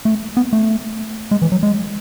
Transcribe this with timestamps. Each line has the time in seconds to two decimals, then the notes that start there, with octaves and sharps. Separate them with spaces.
0.05 A3
0.37 B3
0.53 A3
1.31 G#3
1.42 E3
1.52 F#3
1.63 G#3